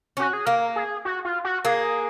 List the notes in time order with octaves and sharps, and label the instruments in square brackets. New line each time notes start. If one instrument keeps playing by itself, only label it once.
[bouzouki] C#4 [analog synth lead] F#4
[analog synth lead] G#4
[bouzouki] A#3 [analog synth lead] A#4
[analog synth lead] G#4
F#4
F4
F#4
[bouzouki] A#3 [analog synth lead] G#4